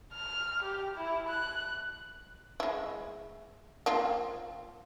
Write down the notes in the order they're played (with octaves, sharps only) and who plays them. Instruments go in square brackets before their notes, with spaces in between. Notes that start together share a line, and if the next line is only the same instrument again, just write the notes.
[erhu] F6
G4
E4
F#6
[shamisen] G#3 E4
A#3 C4 F4